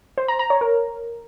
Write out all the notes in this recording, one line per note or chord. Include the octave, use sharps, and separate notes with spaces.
C5
A#5
A#5
C#5
A#4